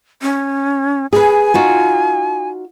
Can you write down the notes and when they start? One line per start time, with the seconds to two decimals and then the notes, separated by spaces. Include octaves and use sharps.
0.22 C#4
1.13 G#4 B4 G#5
1.54 D#4 F4 F#4